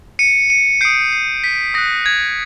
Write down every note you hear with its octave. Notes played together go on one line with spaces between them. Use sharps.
C#7 D#7
C#7 D#7
D#6 G6 C7 D7
C7
B6
D#6 F#6 A#6
G#6